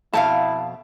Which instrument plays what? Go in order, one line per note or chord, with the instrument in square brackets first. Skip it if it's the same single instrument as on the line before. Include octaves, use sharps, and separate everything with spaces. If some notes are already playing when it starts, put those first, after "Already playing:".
[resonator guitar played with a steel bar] F2 B2 F5 [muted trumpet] E4 [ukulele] A5